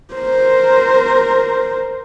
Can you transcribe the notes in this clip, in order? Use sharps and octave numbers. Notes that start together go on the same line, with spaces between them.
A#4 C5